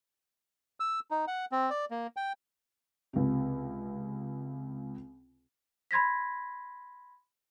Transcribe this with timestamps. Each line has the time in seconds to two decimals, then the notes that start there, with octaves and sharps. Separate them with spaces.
0.80 E6
1.11 D#4
1.27 F#5
1.52 C4
1.70 D5
1.91 A#3
2.16 G5
3.13 C#2 C3
5.91 B5 C6 G#6 A#6 B6